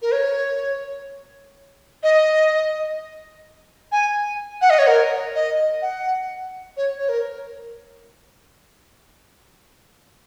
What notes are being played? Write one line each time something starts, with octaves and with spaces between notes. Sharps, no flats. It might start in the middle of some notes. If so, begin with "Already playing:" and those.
A#4
C#5
D#5
G#5
F#5
D#5
C#5
A#4
D#5
F#5
C#5
C#5
A#4